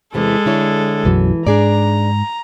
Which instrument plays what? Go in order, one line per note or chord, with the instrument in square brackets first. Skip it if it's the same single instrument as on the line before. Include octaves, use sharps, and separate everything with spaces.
[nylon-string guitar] E2 C3 E3 [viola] G#3 A4
[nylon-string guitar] D3 E4 C#5
[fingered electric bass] B1 F#2 F#3 [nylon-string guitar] E3
[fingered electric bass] G#2 [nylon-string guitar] D4 G#4 D5 [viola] A#5